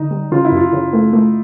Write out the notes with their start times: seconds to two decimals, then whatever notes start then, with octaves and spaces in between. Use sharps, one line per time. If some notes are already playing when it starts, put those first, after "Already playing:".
Already playing: D3 D#4
0.11 G3
0.32 C#3 F4
0.45 E4
0.52 F#2 F4
0.73 C#3
0.93 A3
1.13 A3